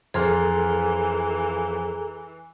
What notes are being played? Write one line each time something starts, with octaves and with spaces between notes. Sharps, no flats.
F2 E3 G#4 A4 A#5 C6 F6